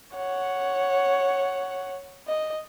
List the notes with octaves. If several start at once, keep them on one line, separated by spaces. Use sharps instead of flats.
C#5 F#5
D#5